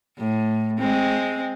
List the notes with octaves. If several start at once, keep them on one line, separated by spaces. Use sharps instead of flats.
A2
G#3 C4